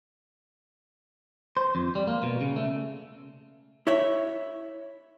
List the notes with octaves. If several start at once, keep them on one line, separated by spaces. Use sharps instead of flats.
C5
F2
G3
A#3
B2
C#3
A3
E4 C#5 E5